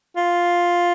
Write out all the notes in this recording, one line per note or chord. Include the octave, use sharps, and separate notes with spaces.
F4